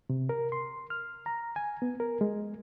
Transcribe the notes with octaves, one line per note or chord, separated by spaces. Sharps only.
C3
A#4
C6
F6
A#5
G#5
B3
A#4
G#3